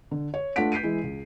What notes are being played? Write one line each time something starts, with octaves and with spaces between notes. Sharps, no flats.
D3
C#5
A3 D4 F4 F#5 B6 D7
G6 B6 C7 D7 D#7
E3 G#3 E4
C#2